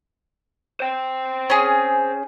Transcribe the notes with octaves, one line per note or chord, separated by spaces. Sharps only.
C5 G5
C#4 G#4